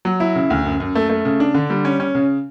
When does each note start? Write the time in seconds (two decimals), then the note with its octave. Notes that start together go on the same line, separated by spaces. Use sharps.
0.05 F#3
0.20 E4
0.36 C#3
0.50 D2
0.66 F#2
0.80 F#2
0.95 A3
1.09 A3
1.25 C#3
1.40 D4
1.54 D3
1.70 G3
1.85 C#4
2.00 C#4
2.15 C#3